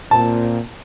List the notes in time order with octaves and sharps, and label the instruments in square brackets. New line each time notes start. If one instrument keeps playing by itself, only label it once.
[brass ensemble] A#2 C4 [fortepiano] A5